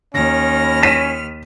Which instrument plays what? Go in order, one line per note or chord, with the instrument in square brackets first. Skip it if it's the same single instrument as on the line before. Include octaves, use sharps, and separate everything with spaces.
[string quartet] D#2 F6 [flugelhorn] C#4 [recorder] A#6
[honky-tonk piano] B6 D#7 E7